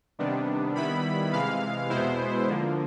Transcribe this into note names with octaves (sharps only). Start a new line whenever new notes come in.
C3 D#3 G3 B3 D4
D#3 G3 B3 E4 B5
C3 E3 G#3 F5
E2 B2 G#3 B3 E4 C5
D3 F3 A#3